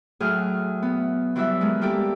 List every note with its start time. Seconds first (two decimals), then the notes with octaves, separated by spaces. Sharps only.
0.20 A2 F#3 G#4 F6
0.82 B3
1.36 E3 F#3 G3 E4 E5
1.61 D#3 G#3
1.81 G3 A#3 E4 G4 A4